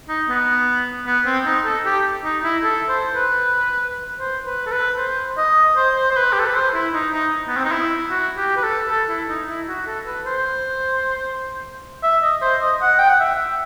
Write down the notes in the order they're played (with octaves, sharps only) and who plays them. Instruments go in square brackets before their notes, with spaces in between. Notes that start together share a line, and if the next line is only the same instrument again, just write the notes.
[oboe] D#4
B3
B3
C4
D#4
A4
G4
D#4
E4
A4
C5
B4
C5
B4
A4
B4
C5
D#5
C5
C5
C5
B4
G4
A4
B4
C5
E4
D#4
D#4
B3
C4
D#4
E4
F#4
G4
B4
A4
A4
E4
D#4
E4
F#4
A4
B4
C5
E5
D#5
C5
D#5
F#5
G5
F#5
E5